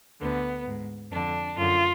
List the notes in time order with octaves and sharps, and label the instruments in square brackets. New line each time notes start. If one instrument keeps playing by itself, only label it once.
[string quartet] D2 D3 B3
G#2
F2 D3 D4
F#2 D3 F4